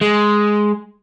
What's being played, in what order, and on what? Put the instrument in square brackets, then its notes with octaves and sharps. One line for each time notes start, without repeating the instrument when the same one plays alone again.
[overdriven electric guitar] G#3